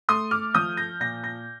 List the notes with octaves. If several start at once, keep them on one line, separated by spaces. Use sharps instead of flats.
A3 C6 D#6
D6 F6
F3 D#6 G6
G6 A#6
A#2 G6 A#6
G6 A#6